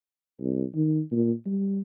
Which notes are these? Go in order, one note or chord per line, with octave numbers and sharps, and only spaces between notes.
C2
D#3
A#2
G3